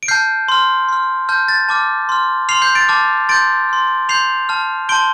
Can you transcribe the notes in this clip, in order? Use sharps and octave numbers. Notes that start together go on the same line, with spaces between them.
D7
A5 F6 G6 C7
C6 F6
C6 F6
A5 F6 G6
A6
A5 D6 F6
C6 F6
C6 F6 C7 F7
G6 C7
A6 D7
A5 D6 F6
C6 G6 A6 D7
C6 F6
C6 G6 C7 F7
A5 F6
A5 C6 G6 D7 G7